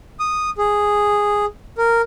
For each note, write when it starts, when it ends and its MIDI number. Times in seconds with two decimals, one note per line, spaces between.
0.19 0.50 87
0.58 1.45 68
1.78 2.02 70